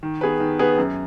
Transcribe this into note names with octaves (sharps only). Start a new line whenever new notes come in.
D#3
B3 G#4 B4
D#3
B3 G#4 B4
F#2